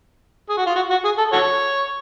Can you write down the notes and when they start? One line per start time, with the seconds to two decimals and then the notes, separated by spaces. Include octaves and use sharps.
0.50 G#4
0.57 F#4
0.66 F4
0.76 F#4
0.91 F#4
1.05 G#4
1.18 A4
1.33 F#4 A4 C#5